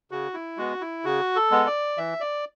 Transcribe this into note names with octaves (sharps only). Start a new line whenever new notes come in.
C#3 F#4
E4
G#3 B3 F#4
E4
C#3 F#4
A4
G#3 B3
D5
E3 E5
D5